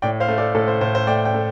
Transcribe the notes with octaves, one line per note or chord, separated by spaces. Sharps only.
A2 D5 G5
C5 F5
A3
A4 D5
A2 A4
C5
A2 C5
C5
A3 D5 G5
D5 G5
A3